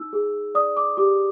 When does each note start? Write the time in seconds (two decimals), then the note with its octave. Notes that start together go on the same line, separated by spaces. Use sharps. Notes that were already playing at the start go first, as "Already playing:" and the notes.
Already playing: D#4 E6
0.13 G#4
0.55 D5 D#6
0.77 D6
0.97 G4 D6